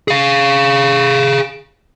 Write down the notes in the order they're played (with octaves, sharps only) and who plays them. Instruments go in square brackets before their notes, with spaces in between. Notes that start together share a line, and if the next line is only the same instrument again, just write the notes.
[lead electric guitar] G#4 F5